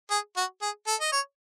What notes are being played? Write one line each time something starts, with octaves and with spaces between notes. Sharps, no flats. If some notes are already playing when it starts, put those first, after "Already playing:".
G#4
F#4
G#4
A4
D#5
C#5